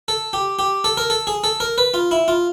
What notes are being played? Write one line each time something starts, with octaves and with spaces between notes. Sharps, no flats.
A4
G4
G4
A4
A#4
A4
G#4
A4
A#4
B4
F4
E4
F4